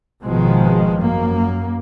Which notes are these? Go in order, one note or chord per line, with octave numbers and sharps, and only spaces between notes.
G#1 B2 D#3 F3 G#3
F#2 A#3